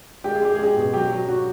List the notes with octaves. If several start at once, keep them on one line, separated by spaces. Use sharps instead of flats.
G#3 G4
G#4
G#3 G4
G#3 G#4
G4
B2
F#3 G4
F#3
F#3 F#4